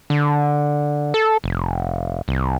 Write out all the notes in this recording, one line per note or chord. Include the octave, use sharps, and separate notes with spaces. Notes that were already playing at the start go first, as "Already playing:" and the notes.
D3
A4
F1
C2